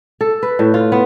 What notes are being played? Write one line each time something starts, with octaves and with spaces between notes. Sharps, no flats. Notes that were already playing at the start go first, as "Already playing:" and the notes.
A4
B4
A2
F4
B3